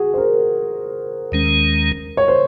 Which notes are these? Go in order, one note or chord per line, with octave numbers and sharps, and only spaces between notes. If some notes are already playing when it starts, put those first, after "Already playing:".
Already playing: F#4 G#4
C5
A#4
D#2 D#3 G#3 C#4
C#5
C5